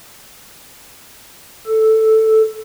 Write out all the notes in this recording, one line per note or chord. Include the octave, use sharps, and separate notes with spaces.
A4